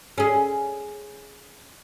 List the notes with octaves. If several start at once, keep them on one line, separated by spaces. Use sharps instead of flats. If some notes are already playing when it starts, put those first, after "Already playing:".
C#4 G#4